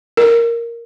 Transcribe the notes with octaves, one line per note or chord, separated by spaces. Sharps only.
A#4